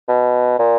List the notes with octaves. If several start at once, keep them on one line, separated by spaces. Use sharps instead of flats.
B2
A#2